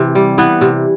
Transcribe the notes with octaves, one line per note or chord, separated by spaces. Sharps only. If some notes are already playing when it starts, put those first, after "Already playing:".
Already playing: C3 E3
G3
E3 B3
C3